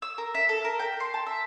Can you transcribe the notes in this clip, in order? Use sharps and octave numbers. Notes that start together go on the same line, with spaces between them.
E6
A#4
E5
A4
A#4
G5
C6
A5
E5